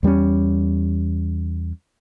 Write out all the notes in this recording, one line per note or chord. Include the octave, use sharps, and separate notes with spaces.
E2 G3 A#3 C#4